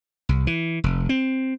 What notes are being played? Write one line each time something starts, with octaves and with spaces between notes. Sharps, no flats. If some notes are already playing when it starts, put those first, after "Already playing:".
C2
E3
F1
C4